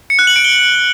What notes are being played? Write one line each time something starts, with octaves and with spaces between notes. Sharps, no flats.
C#7
F#6
F#7
D7
G7